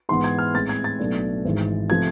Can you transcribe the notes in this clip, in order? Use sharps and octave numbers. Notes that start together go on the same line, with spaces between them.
G#2 E3 B3 E4 C6
G#6
F6
A2 G#3 C4 A6
G#6
A6
B1 B2 A3 D4
G#1 G#2 E3 G#3
C3 F3 A3 G#6